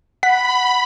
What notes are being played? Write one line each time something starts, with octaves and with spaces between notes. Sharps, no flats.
F#5 B5 B6